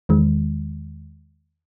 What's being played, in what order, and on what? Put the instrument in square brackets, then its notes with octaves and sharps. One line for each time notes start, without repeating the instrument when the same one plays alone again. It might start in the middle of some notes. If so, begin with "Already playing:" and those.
[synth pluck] E2 D#3 G#3